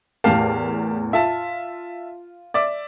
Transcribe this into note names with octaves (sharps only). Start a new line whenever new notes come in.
E2 A2 G4 A#4 F5 A5
F4 E5 A5
D5 E5 D6